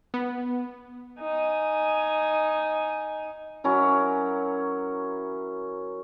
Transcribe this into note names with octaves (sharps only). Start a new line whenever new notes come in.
B3
D#4 G#5
F#3 C#4 E4 A#4